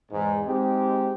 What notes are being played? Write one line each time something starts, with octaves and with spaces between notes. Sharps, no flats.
E2 G#2
G#3 C4 D#4 G4